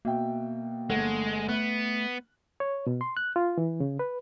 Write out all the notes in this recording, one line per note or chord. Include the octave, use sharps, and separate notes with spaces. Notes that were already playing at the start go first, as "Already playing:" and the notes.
B2 A#3 E5 G5
G1 G#3 A3 F#5
A3 B3 F#6
C#5
B2
C6
F#6
F4
E3
C#3
B4